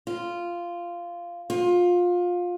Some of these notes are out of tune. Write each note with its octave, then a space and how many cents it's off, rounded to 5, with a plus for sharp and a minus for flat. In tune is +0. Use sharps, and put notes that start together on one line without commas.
F4 -10
F4 +20